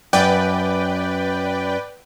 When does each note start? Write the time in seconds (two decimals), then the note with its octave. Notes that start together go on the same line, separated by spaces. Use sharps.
0.13 F#2 B4 D5 G5